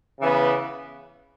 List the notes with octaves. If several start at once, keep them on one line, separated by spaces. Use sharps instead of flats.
C#3 E3 B3